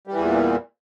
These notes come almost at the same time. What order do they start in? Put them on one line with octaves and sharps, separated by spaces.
G3 E3 E2 A#2